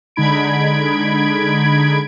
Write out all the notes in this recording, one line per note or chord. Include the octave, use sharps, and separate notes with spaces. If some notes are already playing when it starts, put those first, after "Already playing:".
D3 G#3 D#4 B5 G#6 D7